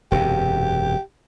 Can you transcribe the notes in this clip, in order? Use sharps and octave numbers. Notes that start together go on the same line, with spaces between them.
E1 F#2 C3 G4